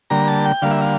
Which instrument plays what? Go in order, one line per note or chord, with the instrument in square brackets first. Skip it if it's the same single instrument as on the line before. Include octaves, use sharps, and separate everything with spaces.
[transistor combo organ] D3 G3 A#3 A#5
A5
G5
D3 G3 A#3 F5
E5
F5